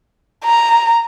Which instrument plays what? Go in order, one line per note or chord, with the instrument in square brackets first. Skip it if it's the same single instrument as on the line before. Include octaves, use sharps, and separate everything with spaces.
[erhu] A#5